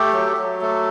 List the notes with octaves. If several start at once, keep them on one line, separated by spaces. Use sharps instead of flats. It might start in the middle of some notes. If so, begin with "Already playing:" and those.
Already playing: A3 G4
F#3
F#3
A3